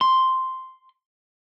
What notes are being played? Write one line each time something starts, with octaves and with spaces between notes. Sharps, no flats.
C6